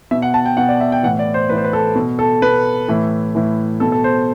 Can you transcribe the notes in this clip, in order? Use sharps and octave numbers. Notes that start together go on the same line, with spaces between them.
B2 E5
F#5
A5
G5
B2 F#5
D5
E5
G5
A2 E3 F#5
D5
C5
A2 E3 B4
C5
B4
A4
B2
A4
B2 B4
A2 E3
A2 E3
B2 A4
A4
C5